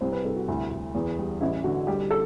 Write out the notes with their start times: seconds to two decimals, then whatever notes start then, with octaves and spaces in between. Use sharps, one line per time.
0.01 C2 C5
0.12 B4
0.24 C2 A4
0.36 F#4
0.48 D2 E4
0.71 D2
0.95 E2
1.18 G3
1.41 A1 E4
1.64 D3 F#4
1.87 G3 G4
2.11 A4